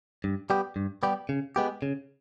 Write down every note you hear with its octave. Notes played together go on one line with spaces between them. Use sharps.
G2
G3 B3 G4
G2
G3 B3 G4
C#3
G#3 B3 G4
C#3